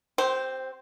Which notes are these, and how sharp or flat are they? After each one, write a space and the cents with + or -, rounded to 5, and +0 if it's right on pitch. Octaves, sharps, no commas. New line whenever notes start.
C4 +0 G4 -30 C5 +0